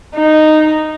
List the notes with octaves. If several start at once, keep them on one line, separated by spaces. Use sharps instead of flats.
D#4